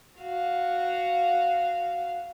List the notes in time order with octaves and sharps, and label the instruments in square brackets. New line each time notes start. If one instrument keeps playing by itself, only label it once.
[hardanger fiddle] F#4 F5